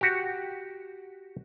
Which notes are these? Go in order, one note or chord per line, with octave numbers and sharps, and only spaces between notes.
F#4 G4